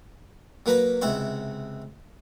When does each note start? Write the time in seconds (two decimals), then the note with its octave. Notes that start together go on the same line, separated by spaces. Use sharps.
0.66 F#3 A#3 B4 A#5 B5
1.02 C#2 C3 E4 F#5 C#6